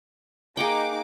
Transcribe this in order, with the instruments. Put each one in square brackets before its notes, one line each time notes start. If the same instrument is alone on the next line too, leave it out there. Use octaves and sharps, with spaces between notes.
[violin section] A#3 D#4 D6 [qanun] G#4 F#5 G5